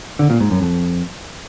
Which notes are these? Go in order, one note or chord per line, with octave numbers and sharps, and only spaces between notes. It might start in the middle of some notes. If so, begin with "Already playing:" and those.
D3
A#2
G#2
F#2
F2